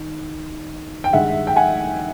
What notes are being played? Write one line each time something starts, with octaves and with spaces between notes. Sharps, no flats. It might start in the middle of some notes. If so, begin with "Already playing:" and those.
Already playing: D#3
G5
G2 D#3 G#3 E5 F#5
G5
F#5 G#5